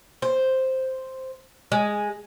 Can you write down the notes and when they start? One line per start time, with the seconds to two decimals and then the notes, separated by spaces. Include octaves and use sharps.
0.22 C5
1.72 G#3